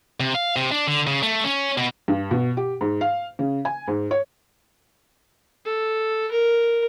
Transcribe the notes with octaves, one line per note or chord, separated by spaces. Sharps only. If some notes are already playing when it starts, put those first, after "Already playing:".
C3
F5
C3
D4
D3
C#3
A3
C#4
B2
G2
B2
G4
G#2
F5
C#3
G#5
G#2
C#5
A4
A#4